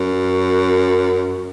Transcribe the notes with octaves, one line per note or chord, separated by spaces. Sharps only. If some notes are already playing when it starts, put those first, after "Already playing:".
Already playing: F#2